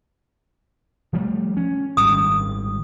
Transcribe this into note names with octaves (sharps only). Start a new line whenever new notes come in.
F3 G3 A3
C#4
G#1 D#3 G3 D#6